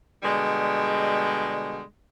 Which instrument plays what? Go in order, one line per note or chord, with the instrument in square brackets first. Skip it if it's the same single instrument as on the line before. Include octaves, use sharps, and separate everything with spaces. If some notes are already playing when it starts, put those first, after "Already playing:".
[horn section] B2 D3 G3 G#3